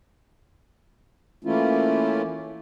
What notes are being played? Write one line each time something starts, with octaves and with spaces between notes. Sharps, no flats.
E3 A3 A#3 C#4 E4 F4